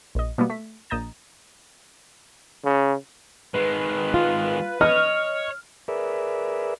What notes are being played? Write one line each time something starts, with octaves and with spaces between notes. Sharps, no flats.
A#1 D#5
B2 G3 A#3 B3
A3 B6
A#1 D#5 A#5 G6 A6 E7
C#3
D#3 G#3 B4
F4
C#5 D#5 F6
G#4 A#4 B4 D5 E5